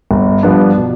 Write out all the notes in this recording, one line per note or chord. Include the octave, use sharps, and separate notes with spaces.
G1
G2 F3 B3 D4
B2